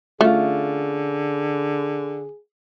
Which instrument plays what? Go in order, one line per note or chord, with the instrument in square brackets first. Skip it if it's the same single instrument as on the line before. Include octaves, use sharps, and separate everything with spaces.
[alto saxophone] D3 [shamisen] A3 [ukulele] C#4 F4 [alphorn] G#4